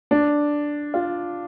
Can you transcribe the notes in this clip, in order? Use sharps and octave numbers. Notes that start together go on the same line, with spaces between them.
D4
F4